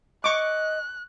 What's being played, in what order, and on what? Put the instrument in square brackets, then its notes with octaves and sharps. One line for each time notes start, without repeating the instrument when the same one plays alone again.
[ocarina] D#5 [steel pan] C#6 D6 [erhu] F#6